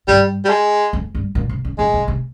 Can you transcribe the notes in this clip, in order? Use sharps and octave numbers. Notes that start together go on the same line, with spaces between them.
G2 G3
G3
G#3
F2
G2
A#2
C3
C#3
A#2 G#3
C3
C3